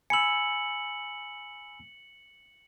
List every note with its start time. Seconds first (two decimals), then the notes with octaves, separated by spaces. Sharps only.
0.10 G#5 B5 E6 C#7 F#7